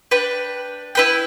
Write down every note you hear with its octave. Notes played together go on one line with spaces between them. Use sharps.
D4 B4 G5
E4 B4 G5